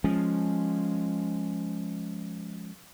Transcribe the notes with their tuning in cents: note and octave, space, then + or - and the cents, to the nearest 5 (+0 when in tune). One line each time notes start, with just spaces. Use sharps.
F3 +0 G#3 +0 C#4 +0